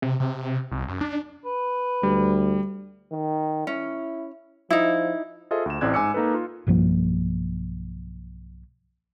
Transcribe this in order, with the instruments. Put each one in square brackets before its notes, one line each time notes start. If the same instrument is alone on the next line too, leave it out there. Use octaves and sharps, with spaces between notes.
[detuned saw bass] C3
C3
C2
F#2
D4
[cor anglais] B4
[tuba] D2 [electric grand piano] G3
[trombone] D#3
[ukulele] C#4 [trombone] E4
[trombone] F3 [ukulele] D#4 E4
[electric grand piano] F4 G#4 A4 C5 D#5 E5
D2 E7
A1 A2 C4 D5 F#6 G#6
G#2 G#5 D6 E6 C#7
A#3 D#4 A4 B4
F4
[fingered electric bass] B1 G2 F3 A#3